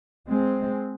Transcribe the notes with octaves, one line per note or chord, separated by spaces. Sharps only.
G#3 C4